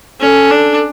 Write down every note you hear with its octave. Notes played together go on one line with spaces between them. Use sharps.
C#4 A4
D4